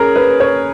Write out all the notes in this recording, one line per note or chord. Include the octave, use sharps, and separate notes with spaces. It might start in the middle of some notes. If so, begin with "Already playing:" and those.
Already playing: C#4 G#4 A#4
B4
C#5